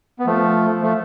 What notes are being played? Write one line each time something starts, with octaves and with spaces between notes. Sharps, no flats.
B3
F3 A3
F3 A3